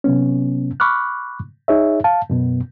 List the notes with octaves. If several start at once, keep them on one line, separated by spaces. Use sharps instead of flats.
C3 F#3 B3 C#4
B5 C#6 D6 F6 F#6
D#4 G#4 C#5 E5
F5 A5
F#2 B2 B3